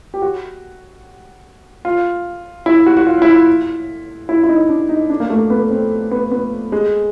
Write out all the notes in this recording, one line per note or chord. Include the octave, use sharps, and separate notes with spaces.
G4
F#4
F4
E4
F#4
F#4
F4
E4
F4
E4
E4
D#4
D4
D#4
D4
A#3
A3
B3
C4
B3
B3
G#3